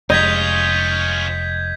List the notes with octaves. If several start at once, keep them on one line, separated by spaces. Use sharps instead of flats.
F1 G#3 C#4 F4 D#5 G6 G#6 B6